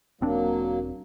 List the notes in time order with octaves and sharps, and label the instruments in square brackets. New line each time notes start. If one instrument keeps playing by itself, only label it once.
[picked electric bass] E1 C4 D4 [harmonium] F#3 A#3